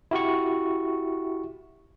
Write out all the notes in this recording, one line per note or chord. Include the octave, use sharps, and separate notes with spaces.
E4 F#4 G4 C#6